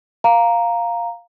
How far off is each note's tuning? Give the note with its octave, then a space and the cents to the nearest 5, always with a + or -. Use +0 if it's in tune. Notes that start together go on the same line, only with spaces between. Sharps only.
F5 +0 A#5 +0